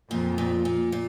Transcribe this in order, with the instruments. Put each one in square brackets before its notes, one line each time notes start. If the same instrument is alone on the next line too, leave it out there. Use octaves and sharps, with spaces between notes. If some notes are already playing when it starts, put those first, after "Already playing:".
[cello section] F2 [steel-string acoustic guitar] A#2
[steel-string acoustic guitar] A#2
A#2
A#2